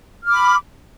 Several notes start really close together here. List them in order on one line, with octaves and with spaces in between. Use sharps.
F6 D6 B5